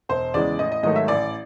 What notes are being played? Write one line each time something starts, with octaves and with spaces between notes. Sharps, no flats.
E1 C5
E2 C#3 E3 G#3 D5
A1 D#5
D#5
G#2 D#3 F#3 A3 D#5
E5
A1 D5